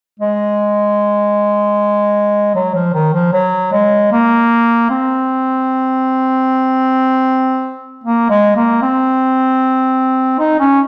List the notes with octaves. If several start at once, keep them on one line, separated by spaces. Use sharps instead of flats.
G#3
F#3
F3
D#3
F3
F#3
G#3
A#3
C4
A#3
G#3
A#3
C4
D#4
C#4